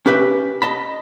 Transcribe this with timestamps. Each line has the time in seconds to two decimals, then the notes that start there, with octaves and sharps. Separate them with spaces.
0.06 C#4 G4 B4 E5 G5
0.62 D#5 A5 B5